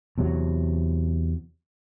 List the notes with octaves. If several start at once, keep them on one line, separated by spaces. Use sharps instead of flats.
E2 C3 F#3